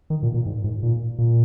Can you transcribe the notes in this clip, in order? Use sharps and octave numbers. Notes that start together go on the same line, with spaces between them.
D#3
A#2
A#2
G#2
G#2
A#2
A#2